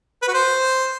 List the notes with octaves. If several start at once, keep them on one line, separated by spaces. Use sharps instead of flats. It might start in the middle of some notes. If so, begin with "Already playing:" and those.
B4
F#4
C5